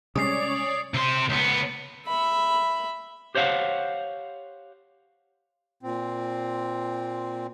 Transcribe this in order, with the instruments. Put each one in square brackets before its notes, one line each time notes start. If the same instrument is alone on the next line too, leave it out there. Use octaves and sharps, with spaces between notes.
[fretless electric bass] C3 G3 G#3 [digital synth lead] C#4 [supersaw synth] C#5 D5 [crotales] D#6 C7
[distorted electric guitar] C3 C6
C#2 B3
[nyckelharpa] E5 B5
[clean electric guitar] G4 C5 C#5 D#5 F5 F#5
[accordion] A#2 C4